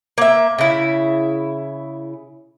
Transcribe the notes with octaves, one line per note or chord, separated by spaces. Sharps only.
A#3 E5
C#3 E4